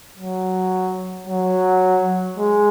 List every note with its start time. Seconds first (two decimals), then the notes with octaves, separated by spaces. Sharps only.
0.17 F#3
1.27 F#3
2.38 G#3